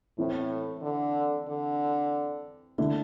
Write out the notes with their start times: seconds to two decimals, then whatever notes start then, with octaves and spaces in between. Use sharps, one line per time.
0.18 A2 E3 C4 E4
0.82 D3
1.48 D3
2.78 D3 A3 E4